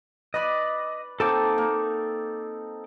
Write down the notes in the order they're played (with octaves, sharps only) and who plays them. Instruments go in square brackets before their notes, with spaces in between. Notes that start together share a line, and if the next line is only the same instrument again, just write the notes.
[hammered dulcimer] B4 D5 B5 [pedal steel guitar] D#5
[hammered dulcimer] A#3 C4 D#4 [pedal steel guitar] A4 A5 D6
[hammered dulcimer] A#3